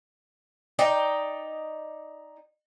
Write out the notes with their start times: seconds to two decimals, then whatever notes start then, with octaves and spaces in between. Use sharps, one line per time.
0.79 D#4 D5 G5